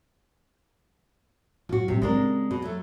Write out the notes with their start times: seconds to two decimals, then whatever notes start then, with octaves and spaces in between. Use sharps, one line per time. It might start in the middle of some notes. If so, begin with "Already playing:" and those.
1.69 A2 F#3 F4 F#4
1.88 A2 C3 G3
2.02 C#3 G#3 C4 D4 A#4
2.51 B2
2.62 F#3 A3